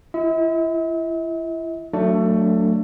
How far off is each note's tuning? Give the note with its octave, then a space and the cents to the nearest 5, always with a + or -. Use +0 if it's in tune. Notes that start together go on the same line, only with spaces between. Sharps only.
E4 +35 E5 -45
F#3 +0 A3 +20 D4 +0